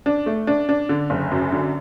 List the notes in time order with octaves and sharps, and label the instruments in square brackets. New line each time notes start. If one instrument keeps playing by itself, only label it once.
[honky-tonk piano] D4
A3
D4
D4
D3
F#1
F#2
D3